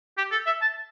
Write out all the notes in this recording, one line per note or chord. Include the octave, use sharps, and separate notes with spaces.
G4
A4
E5
A5